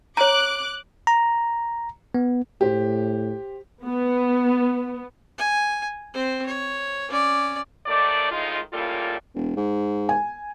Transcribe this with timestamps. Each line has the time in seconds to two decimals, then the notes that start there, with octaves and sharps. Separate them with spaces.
0.17 C#5 A#5 D6 F#6
1.07 A#5
2.15 B3
2.61 A2 G4 C5
3.85 B3
5.38 G#5
6.14 C4 C5
6.46 C#5
7.09 C#4 D5
7.86 D#2 D#3 A3 D5
8.31 A2 D#3 G#3 D#4 F4
8.73 A2 C#3 G3 A#3 F4 A4
9.34 E1
9.57 G#2
10.09 G#5